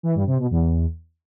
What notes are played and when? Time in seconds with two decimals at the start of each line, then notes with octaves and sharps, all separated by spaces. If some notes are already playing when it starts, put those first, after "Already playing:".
0.03 E3
0.15 G2
0.27 C3
0.39 B2
0.51 E2